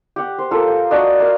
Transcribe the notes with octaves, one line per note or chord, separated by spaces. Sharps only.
G4 F#5
C5
A#3 F4 A4
G#5
D4 F#4 D5 D#5
A#3 F5